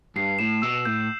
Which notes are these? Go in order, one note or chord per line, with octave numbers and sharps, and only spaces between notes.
G2 C7
A2 E7
B2 E6
A2 G6